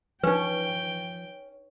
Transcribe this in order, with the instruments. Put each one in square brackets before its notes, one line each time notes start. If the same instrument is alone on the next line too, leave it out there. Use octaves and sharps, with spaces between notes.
[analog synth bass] F3 [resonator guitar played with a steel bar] C#4 [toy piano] D#4 B4 [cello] G5